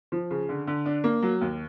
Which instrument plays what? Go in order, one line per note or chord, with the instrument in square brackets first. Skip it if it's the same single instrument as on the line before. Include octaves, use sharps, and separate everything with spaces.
[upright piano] F3
C#3
D3
D3
D4
A#3
F#3
D#2